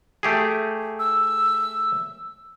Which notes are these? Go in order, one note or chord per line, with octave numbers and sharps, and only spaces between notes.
A3 G4 G#4
E6